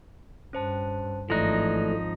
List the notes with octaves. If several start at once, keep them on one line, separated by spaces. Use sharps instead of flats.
G2 C#4 C5 A5
G#1 E3 F3 A3 D#4 D5 F#6 A#6